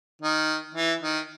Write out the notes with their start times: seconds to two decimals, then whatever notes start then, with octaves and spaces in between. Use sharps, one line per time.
0.22 D#3
0.74 E3
1.01 D#3